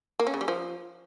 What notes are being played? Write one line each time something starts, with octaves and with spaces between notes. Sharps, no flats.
A#3
C#4
C#3
G3
F3